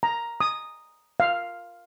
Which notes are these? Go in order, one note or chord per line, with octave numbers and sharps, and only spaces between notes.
A#5
D#6
F5